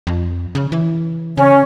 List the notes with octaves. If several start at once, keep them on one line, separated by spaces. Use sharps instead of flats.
F2
C#3
E3
C#3 C#4